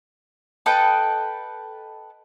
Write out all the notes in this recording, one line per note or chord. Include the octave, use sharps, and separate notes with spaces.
A4 B4 D#5 G5